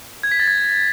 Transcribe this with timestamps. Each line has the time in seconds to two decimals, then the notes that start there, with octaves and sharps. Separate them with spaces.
0.23 G#6
0.32 B6
0.40 A6
0.48 G#6